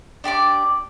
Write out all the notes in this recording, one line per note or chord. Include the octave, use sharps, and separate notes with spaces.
D4 G4 D5 D6